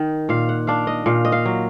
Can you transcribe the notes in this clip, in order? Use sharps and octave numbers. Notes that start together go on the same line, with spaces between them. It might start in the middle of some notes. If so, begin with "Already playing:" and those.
Already playing: D#3 D#4
A#2 F5
F#5
D4 F5
D#5
A#2 F5
D#5
F5
F#3